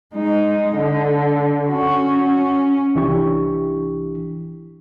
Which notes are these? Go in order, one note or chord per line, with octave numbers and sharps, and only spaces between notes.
G#3 D#4
D3
C#4 F#4
C#4
C2 E3 D4 E4 G4 C#6